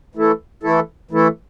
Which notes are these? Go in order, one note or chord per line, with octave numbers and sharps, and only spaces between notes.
E3 A3 E4 A4
E3 A3 E4 A4
E3 A3 E4 A4